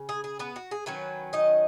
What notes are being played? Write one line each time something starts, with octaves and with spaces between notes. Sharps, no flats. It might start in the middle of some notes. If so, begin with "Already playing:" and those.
Already playing: C#3
G#4
G#4
B3 B4
F#4
G#4
D#3 F#3 C#4 B4
D#4 D#5